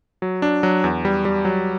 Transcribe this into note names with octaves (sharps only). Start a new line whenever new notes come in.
F#3
D4
F#3
E2
G3
G3
F#3